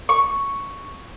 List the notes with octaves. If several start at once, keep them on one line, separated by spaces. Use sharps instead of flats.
C#6